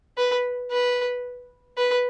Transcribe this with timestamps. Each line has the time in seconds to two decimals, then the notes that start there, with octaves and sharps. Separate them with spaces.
0.17 B4
0.71 B4
1.77 B4